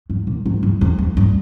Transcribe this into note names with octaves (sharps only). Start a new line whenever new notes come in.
G2
A#2
G#2
G2
F2
F2
G2